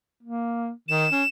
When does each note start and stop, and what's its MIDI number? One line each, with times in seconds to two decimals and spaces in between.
0.23 0.70 58
0.88 1.06 51
0.88 1.29 100
1.12 1.23 61